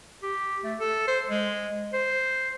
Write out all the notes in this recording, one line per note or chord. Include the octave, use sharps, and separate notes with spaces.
G4
A3
A4
C5
G#3
C5